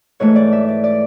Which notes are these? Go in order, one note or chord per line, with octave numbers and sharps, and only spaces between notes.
G#2 E3 A3 C#5
D5
E5
D5
D5